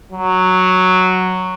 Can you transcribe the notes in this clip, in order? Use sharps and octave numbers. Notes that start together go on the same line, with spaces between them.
F#3